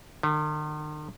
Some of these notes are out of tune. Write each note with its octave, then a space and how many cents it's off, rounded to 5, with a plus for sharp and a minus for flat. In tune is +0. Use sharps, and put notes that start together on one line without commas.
D#3 -45